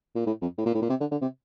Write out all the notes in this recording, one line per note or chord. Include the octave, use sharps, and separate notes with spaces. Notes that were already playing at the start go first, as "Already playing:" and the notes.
A#2
A2
F2
A2
A#2
A2
A#2
C3
D3
D3
C3